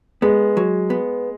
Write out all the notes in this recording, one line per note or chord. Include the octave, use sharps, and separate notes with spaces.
G#3 B3
F#3
B3